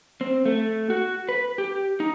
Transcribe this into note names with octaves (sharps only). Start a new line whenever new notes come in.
C4
A3
F#4
B4
G4
D#4